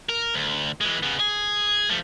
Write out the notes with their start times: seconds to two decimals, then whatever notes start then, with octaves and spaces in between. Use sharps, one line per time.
0.09 A#4
0.34 D2
0.81 E3 G#3
1.03 C#3 B3
1.20 G#4
1.90 F3 A3